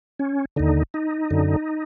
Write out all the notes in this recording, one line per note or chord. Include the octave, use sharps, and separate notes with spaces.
C#4
D#2 D3 D#4
D#4
F#2 D3